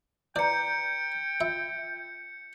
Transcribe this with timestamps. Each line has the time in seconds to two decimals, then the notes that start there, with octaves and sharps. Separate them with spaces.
0.36 E4 B4 D5 G5 A#5 G6 C#7
1.41 F4 E5